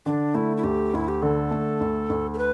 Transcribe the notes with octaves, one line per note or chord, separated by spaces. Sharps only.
D3 D4
A3 E4
E4
D2 G4
D2 E4
G4
D3 A4
A3
D2
D2
A4
B4